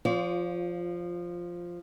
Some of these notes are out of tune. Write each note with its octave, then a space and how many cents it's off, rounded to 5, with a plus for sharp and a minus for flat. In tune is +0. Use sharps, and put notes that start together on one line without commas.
F3 +0 F4 +20 D5 -45